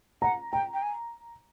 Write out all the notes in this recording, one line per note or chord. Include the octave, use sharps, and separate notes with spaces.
F#5 A#5
G5 A#5
G5
G#5